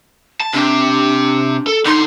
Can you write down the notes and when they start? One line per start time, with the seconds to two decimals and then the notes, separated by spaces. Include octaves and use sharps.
0.40 A5
0.53 C3 D4 G4
1.67 A4
1.86 D3 D#4 C6